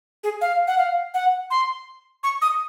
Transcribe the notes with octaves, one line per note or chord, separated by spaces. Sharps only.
G#4
F5
F#5
F5
F#5
C6
C#6
D#6